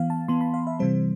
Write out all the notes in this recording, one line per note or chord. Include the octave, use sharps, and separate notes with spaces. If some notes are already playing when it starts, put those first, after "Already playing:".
Already playing: E3 B3 F5
A5
E3 B3 C6
B5
F5
E5
C3 E3 G3 C4 C5